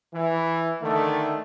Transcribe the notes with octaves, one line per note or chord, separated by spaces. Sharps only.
E3
D3 D#3 A3